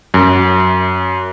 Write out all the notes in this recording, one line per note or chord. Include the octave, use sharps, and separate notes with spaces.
F#2